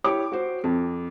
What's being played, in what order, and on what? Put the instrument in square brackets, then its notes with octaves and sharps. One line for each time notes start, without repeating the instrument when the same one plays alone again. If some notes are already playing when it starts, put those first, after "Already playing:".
[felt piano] E4 G4 C#5 D6
F#4 C5
F2